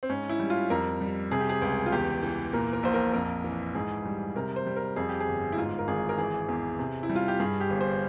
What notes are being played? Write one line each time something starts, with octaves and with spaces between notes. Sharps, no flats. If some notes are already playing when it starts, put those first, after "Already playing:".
C4
G#2 C#4
E4
G3
F4
F2 A#4
G3
C3 G#4
G4
G#4
C#2
F4
E2 G4
E3
A#2 A#4
A#4
A#1 C5
A#4
F2 A#4
E3
G#2 G#4
G3
C3 A#4
C5
G3
A#4
F2 G#4
G4
G#4
G1
E4
G#2 F4
A#4
G#1 G#4
A#4
E3 G#4
E2
C3
E4
G3
F4
G4
G2 G#4
G4
G1
C5